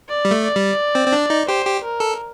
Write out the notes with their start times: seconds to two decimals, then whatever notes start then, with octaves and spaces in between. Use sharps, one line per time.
0.09 D5
0.25 G3
0.31 A3
0.43 D5
0.56 G3
0.95 C4
1.07 C4
1.12 D4
1.30 D#4
1.47 G4 C5
1.65 G4
1.83 A#4
2.00 A4